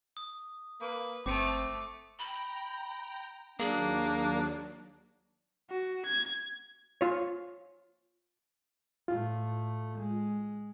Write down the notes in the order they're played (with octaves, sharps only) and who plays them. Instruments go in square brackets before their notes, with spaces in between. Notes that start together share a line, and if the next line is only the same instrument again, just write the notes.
[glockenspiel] D#6
[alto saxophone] A#3 [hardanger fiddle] B4
[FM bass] G1 [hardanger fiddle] A3 [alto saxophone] C4 [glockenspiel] D6 C#7 D#7
[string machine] G5 A#5 [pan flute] B5
[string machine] D#2 F#3 [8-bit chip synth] A#3 [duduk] D4 [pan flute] G#4
[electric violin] F#4
G#6
[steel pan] F4 C#5
[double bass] A2 A3 [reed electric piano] F4
[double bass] G#3